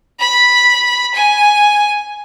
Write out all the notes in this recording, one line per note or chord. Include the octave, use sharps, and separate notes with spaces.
B5
G#5